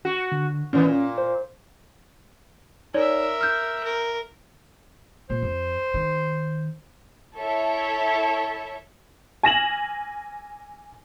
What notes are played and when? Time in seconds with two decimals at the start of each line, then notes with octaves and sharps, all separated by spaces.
0.05 F#4
0.32 D3
0.73 A2 E3 B3 C#4
0.85 A#2
1.18 C5
2.94 D#4 A#4 C#5 D5 E5
3.41 F6 G6
3.83 A#4
5.30 A#2 C5
5.42 F2
5.94 D#3
7.38 E4 A4 C#5 E5
9.43 G#5 A#6 E7 F#7